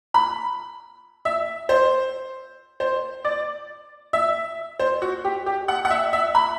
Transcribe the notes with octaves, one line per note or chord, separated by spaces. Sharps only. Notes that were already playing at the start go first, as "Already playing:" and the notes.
B5
E5
C5
C5
D5
E5
C5
F#4
G4
G4
F#5
F#5
E5
E5
B5